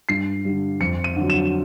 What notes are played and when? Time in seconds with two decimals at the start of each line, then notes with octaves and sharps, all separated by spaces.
0.09 G2 C7
0.45 D3 G3
0.80 F2 C#7
1.04 D#7
1.16 D3 F#3
1.30 E7